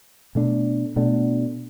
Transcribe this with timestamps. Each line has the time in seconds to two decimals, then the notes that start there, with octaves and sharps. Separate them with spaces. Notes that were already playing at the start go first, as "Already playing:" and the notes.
0.35 B2 A3 D4
0.96 B2 A3 D4